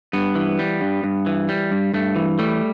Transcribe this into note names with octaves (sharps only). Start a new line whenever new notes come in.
G2 B3
E3
G3
G2
G2
E3
G3
G2
G2 A3
E3
G3 A3